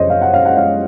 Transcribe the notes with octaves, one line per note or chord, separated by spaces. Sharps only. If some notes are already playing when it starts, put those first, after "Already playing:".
Already playing: F#2 C#3 F3 G#3 C5 C#5 D#5
F5
F#5
F5
F#5
F5